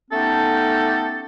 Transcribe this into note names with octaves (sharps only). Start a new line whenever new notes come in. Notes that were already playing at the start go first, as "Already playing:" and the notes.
A3 B3 C#4 D#4 G4 A4